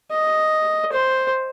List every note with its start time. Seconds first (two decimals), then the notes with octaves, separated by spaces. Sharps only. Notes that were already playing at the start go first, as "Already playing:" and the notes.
0.12 D#5
0.93 C5